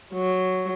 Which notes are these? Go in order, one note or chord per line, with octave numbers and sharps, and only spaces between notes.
F#3